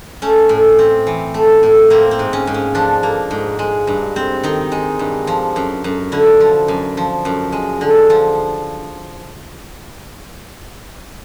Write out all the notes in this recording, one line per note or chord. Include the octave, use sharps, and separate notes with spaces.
A3 C#4
A2
C4
E3
A3
A2
A#3 C4
C4
G#2
C#4
G#2
C#4
F3 D4
A#3
G#2
G#3
G2
C4
D#3 D#4
G#3
G2
F3
F#2
F#2
D3 E4
F3
F#2
F3
F#2
G#3
D3
F3